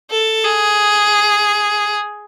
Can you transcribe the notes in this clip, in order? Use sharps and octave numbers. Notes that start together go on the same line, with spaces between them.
A4
G#4